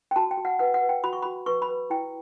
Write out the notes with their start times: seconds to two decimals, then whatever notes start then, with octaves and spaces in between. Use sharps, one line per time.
0.11 G5
0.16 F#4 A5
0.31 G5
0.38 F#4
0.45 F#5
0.59 B4 F#5
0.74 F#5
0.81 B4
0.89 G5
1.03 F#4 B5
1.13 C#6
1.22 B5
1.25 F#4
1.46 B4 C#6
1.62 B5
1.69 B4
1.90 E4 G5